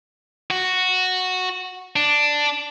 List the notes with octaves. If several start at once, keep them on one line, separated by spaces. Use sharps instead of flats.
F#4
D4